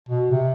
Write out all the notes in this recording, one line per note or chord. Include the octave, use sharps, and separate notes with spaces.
B2
C3